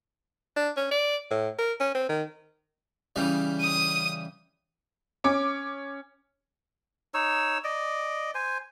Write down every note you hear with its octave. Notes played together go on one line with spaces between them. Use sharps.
D4
C#4
D5
A2
A#4
C#4
C4
D#3
C#3 E3 G3
D#6 D#7
C#4 D6
D#4 C#5 E6
D5 D#5
C5 G#5